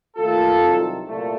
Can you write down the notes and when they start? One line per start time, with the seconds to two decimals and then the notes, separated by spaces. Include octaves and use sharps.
0.17 D#2 D#3 A3 F4 A4
0.62 C2 C3 D#3 F#3
1.06 C2 A#2 A3